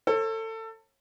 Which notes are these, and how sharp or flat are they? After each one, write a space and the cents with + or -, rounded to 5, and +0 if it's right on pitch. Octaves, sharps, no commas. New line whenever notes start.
A4 +25 C#5 -40